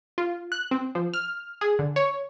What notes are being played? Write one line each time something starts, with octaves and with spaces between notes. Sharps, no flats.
F4
F#6
C4
F3
F6
G#4
D3
C#5